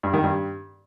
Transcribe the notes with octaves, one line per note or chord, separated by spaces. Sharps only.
G2
D#3
G2